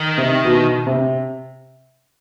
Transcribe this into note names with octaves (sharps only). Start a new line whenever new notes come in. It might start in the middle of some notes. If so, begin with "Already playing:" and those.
Already playing: D#3
C3
B2
C3